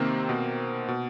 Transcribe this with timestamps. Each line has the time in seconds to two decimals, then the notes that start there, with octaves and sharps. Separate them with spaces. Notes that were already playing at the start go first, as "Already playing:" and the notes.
Already playing: C3 D#3 A#3 C4
0.29 B2
0.88 B2